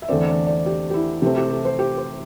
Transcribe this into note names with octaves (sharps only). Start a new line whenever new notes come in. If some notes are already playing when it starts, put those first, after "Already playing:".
E5
E2 D3 A3 C4 D5
D5
D5
G4
G4
E4
C3 A3 C4 G4
G4
A4
C5
G4
C5